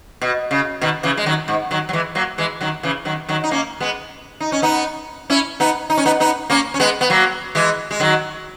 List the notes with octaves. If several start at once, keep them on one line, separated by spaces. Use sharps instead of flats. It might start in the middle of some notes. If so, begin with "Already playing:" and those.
B2
C#3
B2 D#3
C#3 E3
G#3
D#3 F#3
G#2
D#3 F#3
F#3
E3 G#3
F#3 A#3
E3 G#3
D#3 F#3
C#3 E3
D#3 F#3
D#3 F#3
D#4
A#3 C#4
G#3 B3
D#4
C#4
B3 D#4
C#4 E4
B3 D#4
D#4
C#4
B3 D#4
B3 D#4
A#3 C#4
C#4
G#3 B3
B3
F#3 A#3
E3 G#3
G#3
D#3 F#3